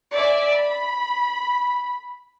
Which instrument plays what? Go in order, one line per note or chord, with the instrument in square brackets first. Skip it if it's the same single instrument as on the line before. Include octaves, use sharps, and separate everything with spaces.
[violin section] D5 E5 G#5
B5